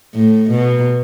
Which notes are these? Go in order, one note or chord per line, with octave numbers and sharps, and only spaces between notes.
A2
B2